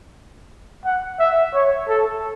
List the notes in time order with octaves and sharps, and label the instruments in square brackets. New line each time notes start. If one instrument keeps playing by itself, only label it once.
[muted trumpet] F#5
E5
C#5
A4